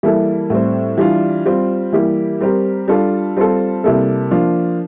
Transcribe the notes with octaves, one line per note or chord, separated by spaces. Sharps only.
E3 G3 A#3 E4 A4
A2 G3 C4
E3 G3 D4 F4
G3 C4 F4
E3 G3 A#3 E4 G4
G3 C4 G4 A#4
G3 D4 F4 A4
G3 C4 F4 A4
C3 G3 A#3 E4 A4
F3 A#3 D4 F4